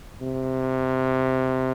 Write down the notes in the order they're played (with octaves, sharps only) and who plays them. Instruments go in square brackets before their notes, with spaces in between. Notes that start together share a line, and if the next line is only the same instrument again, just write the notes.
[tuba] C3